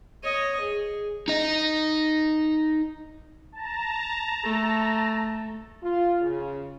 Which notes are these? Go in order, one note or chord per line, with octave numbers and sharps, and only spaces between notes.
C#5 D#5
G#4
D#4 D#5
A5 A#5
A3
F4
C#3